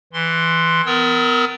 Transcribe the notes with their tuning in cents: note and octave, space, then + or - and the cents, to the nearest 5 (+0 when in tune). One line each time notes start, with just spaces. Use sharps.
E3 +0 C6 +0
B3 +30 A#4 +0 E6 -40